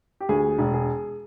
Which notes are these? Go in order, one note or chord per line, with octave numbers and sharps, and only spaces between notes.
G4
D2 G#4
E1
G#4